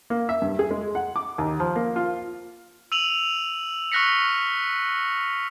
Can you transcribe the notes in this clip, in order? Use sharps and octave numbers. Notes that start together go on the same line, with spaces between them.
A#3
E5
G2
G#4
G#3
F#5
D6
D#2
F3
A#3
F4
E6 D#7 F7 F#7
C#6 F6 F#6 A#6 B6 C#7